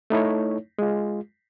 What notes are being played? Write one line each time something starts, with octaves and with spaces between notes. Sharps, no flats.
A3 D#4 E4 C#5
G#3 F4